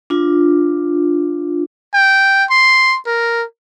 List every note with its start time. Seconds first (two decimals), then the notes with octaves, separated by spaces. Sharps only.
0.10 D4 F4
1.94 G5
2.50 C6
3.06 A#4